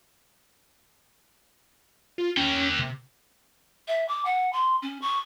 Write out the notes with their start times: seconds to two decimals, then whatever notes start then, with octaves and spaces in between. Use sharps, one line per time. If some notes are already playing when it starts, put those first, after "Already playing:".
2.18 F4
2.37 A#3 C#4 G5
2.79 C3
3.87 E5
4.08 D6
4.25 F#5
4.52 C6
4.82 C#4
5.01 C#6